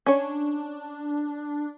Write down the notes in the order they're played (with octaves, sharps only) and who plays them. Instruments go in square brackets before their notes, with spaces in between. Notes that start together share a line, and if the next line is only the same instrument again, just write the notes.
[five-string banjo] C#4 C#5 [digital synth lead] D4